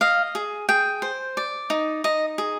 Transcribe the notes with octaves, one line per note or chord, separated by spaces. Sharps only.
D#5 F5
G#4
G#4 G5
C5
D5
D#4
D#4 D#5
G#4